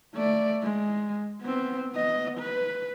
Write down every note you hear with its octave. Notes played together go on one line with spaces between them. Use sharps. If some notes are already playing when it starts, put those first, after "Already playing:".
A3 D5
G#3
B3 C4
B3 D#5
B4